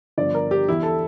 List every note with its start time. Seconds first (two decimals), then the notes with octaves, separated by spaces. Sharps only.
0.17 G1 G2 F3 D5
0.34 A#4
0.51 G4
0.69 E2 E3 E4
0.83 A4